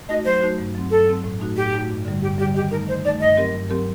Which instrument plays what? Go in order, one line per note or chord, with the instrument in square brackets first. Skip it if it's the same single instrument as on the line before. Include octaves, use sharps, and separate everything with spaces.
[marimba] A3 D#4 F#4 [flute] D#5
[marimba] F#3 [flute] C5
[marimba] A3 D#4 F#4
G2
F#3 C4
[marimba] G2 [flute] A4
[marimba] F#3 C4
A2
A3 D#4 F#4
[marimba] A2 [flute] G4
[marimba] A3 D#4 F#4
G2
D3 G3
[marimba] G2 [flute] G4
[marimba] D3 G3 [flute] G4
[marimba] D#3 [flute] G4
[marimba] A3 D#4 [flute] A#4
[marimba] D#3 [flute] C5
[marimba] A3 D#4 [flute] D5
[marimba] G2 [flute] D#5
[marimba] F#3 C4 G4 A#4
G2
F#3 C4 G4 A#4